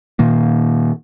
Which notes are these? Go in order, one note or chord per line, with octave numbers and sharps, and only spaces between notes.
A#2 D#3 A#3